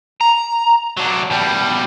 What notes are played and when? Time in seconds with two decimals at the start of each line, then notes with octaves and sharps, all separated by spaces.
0.21 A#5
0.97 F#3 D4
1.30 B2 G3